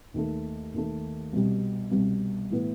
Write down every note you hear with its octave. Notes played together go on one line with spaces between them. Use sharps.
D#2 D#3 A3
D#2 D#3 A3
C2 B2 G3
C2 B2 G3
A2 E3 B3